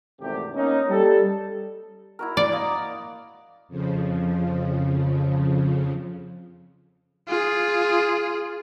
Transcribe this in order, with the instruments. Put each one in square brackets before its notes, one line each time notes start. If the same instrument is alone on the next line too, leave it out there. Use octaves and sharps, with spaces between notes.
[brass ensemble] G#1 E2 C3 A3 G4
A#3 C#4 D#4
G3 A4
[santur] E4 F#4 A#4
[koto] D5
[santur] A#3 D#5 A#5
[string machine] F2 C#3 F3
[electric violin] F4 G#4